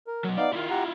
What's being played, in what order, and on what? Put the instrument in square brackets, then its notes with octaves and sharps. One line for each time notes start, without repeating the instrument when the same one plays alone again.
[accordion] A#4
[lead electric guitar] B2 F#3
[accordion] B3 D#4 F5 [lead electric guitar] D5
[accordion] D#3 [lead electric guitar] E4 F4
[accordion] G4 F#5 A#5